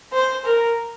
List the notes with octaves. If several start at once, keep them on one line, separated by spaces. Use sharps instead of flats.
C5
A#4